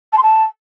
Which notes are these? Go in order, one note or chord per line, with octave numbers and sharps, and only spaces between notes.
A5
C6
A5